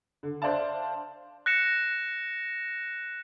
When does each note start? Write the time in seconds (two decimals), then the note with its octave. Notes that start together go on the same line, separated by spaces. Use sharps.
0.23 D3
0.42 D4 C5 D5 E5 F5 A5
1.46 F#6 A#6 C#7 E7